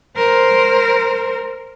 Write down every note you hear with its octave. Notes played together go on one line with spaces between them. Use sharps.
A#4 C5